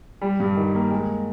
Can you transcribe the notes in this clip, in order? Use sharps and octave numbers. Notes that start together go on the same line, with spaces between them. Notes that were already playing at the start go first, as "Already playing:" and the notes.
G3
G2
D#3
A#3
G#3